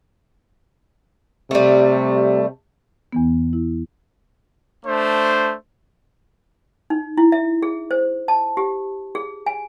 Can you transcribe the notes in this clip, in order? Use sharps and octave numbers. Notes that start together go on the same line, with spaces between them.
C3 G3 A3
E2 E3 B3
E4
A3 D4 C5
D#4
E4
E5
G#4
C5
A5
G4
G#4
G#5